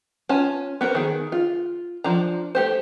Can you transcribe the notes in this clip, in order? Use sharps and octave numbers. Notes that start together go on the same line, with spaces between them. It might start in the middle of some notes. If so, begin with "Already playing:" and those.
C#4 F4 G#5 A5
B3 F#4 A#4 C5
D#3 G#4
F4
F3 D4 A#5
A3 G4 C5